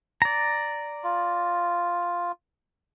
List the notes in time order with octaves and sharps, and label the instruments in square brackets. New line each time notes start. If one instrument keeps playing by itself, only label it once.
[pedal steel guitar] D5 A#5
[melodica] F4